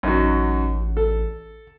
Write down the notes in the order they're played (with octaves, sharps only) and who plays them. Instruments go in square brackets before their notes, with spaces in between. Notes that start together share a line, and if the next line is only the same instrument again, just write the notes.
[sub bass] A1 [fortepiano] F#2 D#4 F#4
[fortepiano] A4